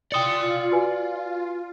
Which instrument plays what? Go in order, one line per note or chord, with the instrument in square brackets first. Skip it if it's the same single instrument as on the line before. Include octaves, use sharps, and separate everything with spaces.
[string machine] F4 [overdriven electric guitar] D5 C6 [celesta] G5 D#6 C#7
[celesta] F#4 B4 G#5